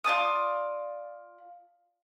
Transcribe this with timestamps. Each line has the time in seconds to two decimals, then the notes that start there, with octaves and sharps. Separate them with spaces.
0.04 F4 D5 A5 D#6